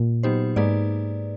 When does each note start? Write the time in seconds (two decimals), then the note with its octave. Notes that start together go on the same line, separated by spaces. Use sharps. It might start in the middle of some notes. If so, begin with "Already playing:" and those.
Already playing: A#2
0.23 F#3 B3 D#4 G4 C5
0.56 G#2 A#3 D#4 G#4 B4 D5